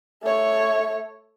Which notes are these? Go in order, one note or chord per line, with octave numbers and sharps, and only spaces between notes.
A3 C#5